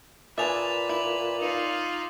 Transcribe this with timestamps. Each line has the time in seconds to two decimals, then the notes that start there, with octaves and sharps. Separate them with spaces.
0.38 A#2 D4 G#4 B4 E5 D6 A6 F7
0.89 E4 D6 F#7
1.40 D#4 F4